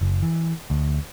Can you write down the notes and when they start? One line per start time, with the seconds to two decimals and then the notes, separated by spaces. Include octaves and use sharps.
0.01 F#1
0.23 E3
0.70 D2